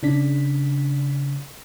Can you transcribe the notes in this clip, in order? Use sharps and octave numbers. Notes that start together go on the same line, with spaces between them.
C#3 D4 B6